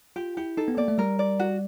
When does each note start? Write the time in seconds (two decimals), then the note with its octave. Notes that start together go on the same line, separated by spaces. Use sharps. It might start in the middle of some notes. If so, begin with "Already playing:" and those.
0.16 F4 G4
0.37 E4 G4
0.57 D#4 A4
0.68 B3
0.77 A#3 D5
0.88 A3
0.98 G3 A#4
1.19 D5
1.39 F#4